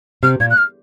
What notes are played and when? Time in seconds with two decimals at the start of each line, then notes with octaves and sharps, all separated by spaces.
0.23 C3 F6
0.40 A#2 G#6
0.50 F#6
0.57 F6